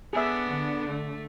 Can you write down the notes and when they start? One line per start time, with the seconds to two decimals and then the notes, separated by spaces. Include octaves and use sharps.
0.13 B3 D4 G#4 E5
0.48 D3
0.88 A3